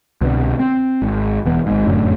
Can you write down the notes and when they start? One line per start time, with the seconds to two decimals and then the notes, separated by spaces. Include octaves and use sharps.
0.21 C2 B2 D3
0.60 C4
1.02 G#1
1.45 E1 E3 B3
1.66 G#1 G#2
1.87 F1 F#2 A2 D3